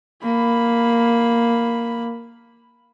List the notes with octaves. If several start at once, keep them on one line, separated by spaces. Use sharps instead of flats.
A#3 B5